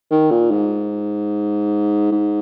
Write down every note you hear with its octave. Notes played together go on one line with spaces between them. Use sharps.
D#3
A#2
G#2
G#2